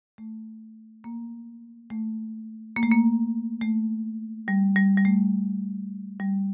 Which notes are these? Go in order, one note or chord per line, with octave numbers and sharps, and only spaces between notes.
A3
A#3
A3
A#3
A3
A#3
A3
G3
G3
G3
A3
G3